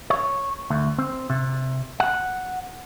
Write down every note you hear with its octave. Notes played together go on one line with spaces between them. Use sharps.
C#5
D2
C4
C3
F#5